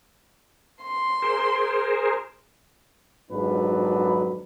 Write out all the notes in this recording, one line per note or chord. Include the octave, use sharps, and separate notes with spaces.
C6
G#4 A#4 C5
G#1 F2 G#2 F#3 D4 B4